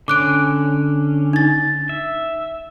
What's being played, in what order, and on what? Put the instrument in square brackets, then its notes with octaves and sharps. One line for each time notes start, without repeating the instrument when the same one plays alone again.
[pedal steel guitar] D3 C#4 [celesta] D6 F#6 D7
[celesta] D#4 A6
[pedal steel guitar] E5